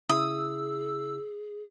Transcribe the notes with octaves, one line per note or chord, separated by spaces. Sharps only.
C#3 E4 G#4 D#6 E6